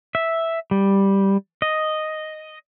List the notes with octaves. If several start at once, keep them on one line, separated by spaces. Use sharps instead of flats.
E5
G3
D#5